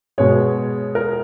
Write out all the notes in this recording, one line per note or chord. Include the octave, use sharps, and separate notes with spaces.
B2 G#3 C#5
A#4